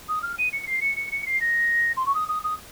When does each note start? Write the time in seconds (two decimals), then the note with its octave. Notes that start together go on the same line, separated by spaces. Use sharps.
0.09 D#6
0.22 F6
0.38 D#7
0.52 C#7
0.67 C7
0.81 C#7
0.96 C#7
1.12 C#7
1.26 C7
1.40 A#6
1.97 C6
2.06 C#6
2.14 D#6
2.28 D#6
2.44 D#6